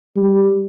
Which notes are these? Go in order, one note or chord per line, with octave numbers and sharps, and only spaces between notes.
G3